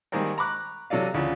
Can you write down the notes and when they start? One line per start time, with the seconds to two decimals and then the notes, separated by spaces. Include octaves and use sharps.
0.12 D#3 G3 G#3 A#3 C4
0.38 A#5 B5 C#6 D6 F#6
0.90 C3 F#3 A4 D5 F5
1.14 D2 C#3 F3